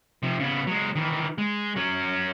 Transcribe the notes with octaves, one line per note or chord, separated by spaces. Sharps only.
C3 F3
C#3 B3
F#3 G#3
D#3 E3
G#3
F#3 C#4